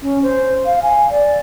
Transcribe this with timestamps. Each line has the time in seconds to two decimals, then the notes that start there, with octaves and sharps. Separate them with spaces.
0.02 C#4
0.22 C5
0.65 F5
0.82 G#5
1.10 D5